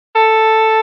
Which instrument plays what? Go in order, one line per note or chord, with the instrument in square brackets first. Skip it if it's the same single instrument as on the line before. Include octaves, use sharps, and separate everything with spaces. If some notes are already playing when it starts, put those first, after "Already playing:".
[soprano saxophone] A4